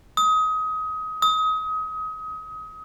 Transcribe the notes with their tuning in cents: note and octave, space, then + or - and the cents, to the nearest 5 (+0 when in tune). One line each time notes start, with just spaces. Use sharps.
D#6 +25
D#6 +30